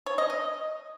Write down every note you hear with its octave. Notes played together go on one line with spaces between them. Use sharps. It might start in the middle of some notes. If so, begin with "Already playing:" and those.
C#5
D#5
D#5